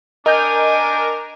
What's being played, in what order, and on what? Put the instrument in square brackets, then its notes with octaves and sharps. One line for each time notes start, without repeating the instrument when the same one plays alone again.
[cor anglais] D4 [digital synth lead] A#4 [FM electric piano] D#5 G6 [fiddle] G#5